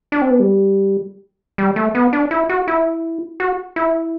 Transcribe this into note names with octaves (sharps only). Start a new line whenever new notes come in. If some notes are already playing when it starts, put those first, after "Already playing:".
D4
C4
B3
G3
G3
A3
B3
D4
E4
F#4
E4
F#4
E4